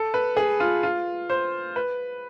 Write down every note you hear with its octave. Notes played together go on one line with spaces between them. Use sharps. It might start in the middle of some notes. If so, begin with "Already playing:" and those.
Already playing: A4
B4
G#4
F4
F4
C5
B4